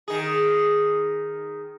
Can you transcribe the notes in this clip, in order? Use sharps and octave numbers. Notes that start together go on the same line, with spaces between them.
D#3 G#4